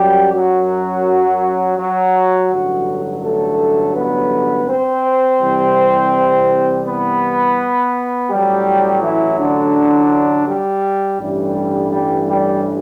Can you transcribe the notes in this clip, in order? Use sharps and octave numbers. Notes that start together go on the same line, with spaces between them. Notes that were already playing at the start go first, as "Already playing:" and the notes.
Already playing: F#2 F#3 G3 G4
F#3 F#4
F#3 F#4
A1 G2 D3 F#3
A3 A4
B3 B4
C4 C5
C2 C3 E3 G3
B3 B4
A1 A2 F#3 G3 G4
E3 E4
D3 D4
G3
A1 G2 E3 G3
G3
G3